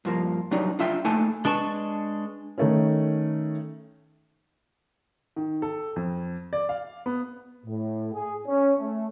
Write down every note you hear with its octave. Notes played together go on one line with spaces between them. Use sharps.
G2 F3 A#3
F#3 G3 D4 D#4
D4 F4 E5 G5
A3 A#3 D#4 A4 G#5 A5
G#3 D4 B4 A5 C#6
D#3 A3 C#4
D#3
A4
F2
D5
F5
B3
A2
G#4
C#4
A3